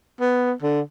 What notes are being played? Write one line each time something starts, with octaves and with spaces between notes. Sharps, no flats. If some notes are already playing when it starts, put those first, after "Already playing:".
B3
D3